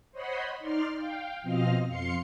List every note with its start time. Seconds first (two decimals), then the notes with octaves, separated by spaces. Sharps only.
0.12 C5 C#5 D#5 F#5 B5 C6
0.59 D#4 D5 C6 F6
0.96 F5 G5
1.42 B2 F3 C4 D#5 F5 F6
1.86 F2 F5 C6 C7 C#7